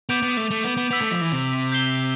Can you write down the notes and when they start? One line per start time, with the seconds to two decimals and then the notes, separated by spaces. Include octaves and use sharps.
0.09 B3 D6 G6 D7 F7
0.23 B3
0.37 A3
0.51 A3
0.64 B3
0.77 B3
0.91 B3 E6 B6 D7 F7
1.01 A3
1.11 F3
1.21 E3
1.32 C3
1.72 G6 C7 E7 G7